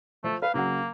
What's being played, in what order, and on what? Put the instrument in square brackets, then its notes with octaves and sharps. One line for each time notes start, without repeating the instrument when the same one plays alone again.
[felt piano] F3 C5 [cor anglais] A3
[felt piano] B4 [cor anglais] F5
[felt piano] C#3 F#3 F#5 [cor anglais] A#3